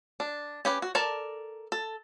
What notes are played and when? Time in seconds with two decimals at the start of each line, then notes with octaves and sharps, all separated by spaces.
0.20 D4
0.65 C#4 G4 B4
0.82 F#4
0.95 A4 A#4 D5 A5
1.72 A4